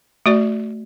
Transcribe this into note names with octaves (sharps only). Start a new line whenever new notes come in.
A3 F#4 D5